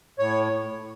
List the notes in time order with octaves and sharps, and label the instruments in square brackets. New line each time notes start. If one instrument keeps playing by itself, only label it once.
[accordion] A2 C#5